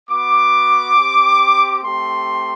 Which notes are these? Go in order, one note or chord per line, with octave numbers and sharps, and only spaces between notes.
B3 F#4 D6
C4 G4
A3 C4 G4 C6